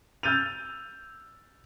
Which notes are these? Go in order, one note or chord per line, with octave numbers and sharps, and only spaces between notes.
E6 F6 G6 A6 D#7 F7